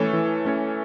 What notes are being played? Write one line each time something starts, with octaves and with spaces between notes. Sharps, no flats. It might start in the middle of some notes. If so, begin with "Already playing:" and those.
Already playing: E3 A3 C#4 A4 C#5
E3
A3 C#4 A4 C#5